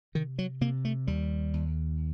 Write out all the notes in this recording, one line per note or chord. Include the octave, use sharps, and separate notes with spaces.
C3 D#3
F#3
C3 A#3
A3
D#2 G3
D#2